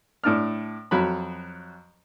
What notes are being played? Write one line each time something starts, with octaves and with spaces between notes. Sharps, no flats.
A2 D4 F6
F2 F#3 B5